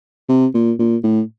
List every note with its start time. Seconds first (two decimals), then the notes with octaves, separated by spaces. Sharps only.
0.29 C3
0.54 A#2
0.79 A#2
1.03 A2